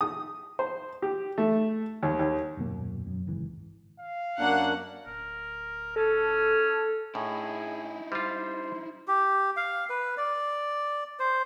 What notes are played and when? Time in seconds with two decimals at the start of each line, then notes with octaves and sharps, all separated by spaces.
0.01 D#6
0.59 C5
1.02 G4
1.38 A3
2.03 D#2
2.19 D#2
2.57 D#1 F#2 B2 A#3
3.06 F#2
3.27 G#1 C#2 E3
4.00 F5
4.39 F#2 A#3 D4 F#5
5.06 D1 A#4
5.96 C#4 A4
7.15 A2 D#4 E4 G#4
8.12 G3 F4 C5
9.08 G4
9.57 F5
9.90 B4
10.17 D5
11.20 C5